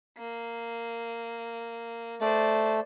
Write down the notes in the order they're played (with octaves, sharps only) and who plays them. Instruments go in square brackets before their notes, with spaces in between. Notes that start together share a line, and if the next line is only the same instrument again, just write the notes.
[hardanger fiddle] A#3
[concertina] A3 [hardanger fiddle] C5 D5